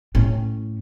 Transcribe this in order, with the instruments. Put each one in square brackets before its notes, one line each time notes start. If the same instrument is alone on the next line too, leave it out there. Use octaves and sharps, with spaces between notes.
[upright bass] A2 C#4